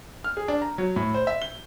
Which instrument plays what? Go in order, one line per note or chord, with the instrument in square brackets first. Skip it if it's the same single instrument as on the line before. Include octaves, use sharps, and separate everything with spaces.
[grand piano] F6
G#4
D4
A#5
F#3
A2
C5
E5
G7